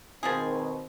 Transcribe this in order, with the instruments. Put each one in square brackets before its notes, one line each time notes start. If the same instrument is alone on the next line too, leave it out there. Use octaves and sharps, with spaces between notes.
[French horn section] B2 D#3 C4 [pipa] F3 G#3 G#4